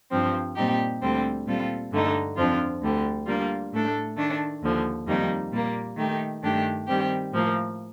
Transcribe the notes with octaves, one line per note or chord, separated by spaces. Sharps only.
G2 F3 C4
A#2 G3 C4 D#4 G4
D2 D3 G3 C4
A#2 G3 C4 F4 A4
G2 D3 A3 D#4
F2 D3 F3 C4 F4
D2 D3 G3
D3 G3 A#3 F4
A2 A3 D4 A4
D#3 A3 D4
D#2 D3 F3
F2 D#3 G3 A#3 D#4
A#2 G3 A#3
D#3 A3 D#4 G4
G2 D#3 A3 D4 G4
D#3 G3 C4 G4
A2 F3 A#3